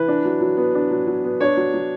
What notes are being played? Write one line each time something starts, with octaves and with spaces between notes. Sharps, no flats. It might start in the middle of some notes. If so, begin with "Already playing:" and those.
Already playing: E3 B4
D4
F#3
F#3
B3
D4
F#3
F#3
B3
D4 C#5
F#3
F#3